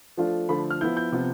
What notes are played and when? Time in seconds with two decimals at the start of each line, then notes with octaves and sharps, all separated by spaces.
0.17 F3 A3 D4 F4
0.49 D3 F3 A3 B5
0.70 F6
0.81 F3 B3 E4 G6
0.97 G6
1.12 C3 F3 B3 F4